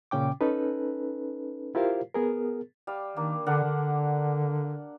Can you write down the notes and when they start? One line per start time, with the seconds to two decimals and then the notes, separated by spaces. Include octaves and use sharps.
0.11 A#2 C#3 C#4 G5 D6
0.41 C#4 D#4 A4 B4
1.75 E4 F4 G4 A#4 C5 F5
2.14 B3 G#4 A#4
2.87 G3 F5
3.16 D#3 A#3 D4
3.46 D3 D4 A#4 F#5
3.63 D3